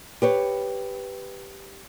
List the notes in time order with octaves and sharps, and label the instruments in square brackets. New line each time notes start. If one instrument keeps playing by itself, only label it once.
[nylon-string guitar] G4 B4 C#5